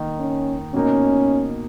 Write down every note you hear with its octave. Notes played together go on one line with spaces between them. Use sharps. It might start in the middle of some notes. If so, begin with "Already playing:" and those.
Already playing: D#3 A#3 D#4
C#4
B2 A#3 C#4 D#4